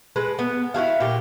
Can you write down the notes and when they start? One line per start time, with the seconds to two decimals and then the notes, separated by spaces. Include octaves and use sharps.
0.16 G#3 A4 B4
0.39 B3
0.74 E4 F#4 G#4 F5
1.00 A#2 G4